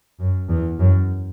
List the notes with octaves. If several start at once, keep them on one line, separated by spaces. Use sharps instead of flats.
F#2
E2
F#2